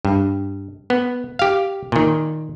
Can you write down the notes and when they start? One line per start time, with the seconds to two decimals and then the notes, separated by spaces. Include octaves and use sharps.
0.05 G2
0.90 B3
1.39 G4 F5
1.92 A#2 D#3